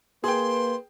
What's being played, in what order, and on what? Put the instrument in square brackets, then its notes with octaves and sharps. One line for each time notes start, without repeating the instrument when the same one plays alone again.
[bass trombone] A#3 [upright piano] G#4 G5 [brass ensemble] B4 [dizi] C6